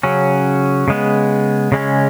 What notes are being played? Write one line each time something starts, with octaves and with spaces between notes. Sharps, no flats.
C#3 F#3 C#4
C#3 G#3 B3
C#3 G#3 C#4